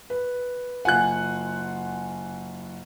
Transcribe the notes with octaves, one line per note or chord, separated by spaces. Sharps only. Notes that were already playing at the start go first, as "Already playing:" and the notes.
B4
F#1 F4 F#5 G#5 F#6